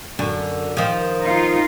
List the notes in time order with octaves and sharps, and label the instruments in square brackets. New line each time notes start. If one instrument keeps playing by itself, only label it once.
[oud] F#2 D3
D#3 F3
[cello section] D#4 F4